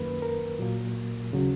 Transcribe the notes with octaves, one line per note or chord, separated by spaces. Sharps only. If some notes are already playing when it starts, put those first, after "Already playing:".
Already playing: F#2 D#3 A#3 B4
A#4
A#2 F#3 A#3
D#2 C#3 F#3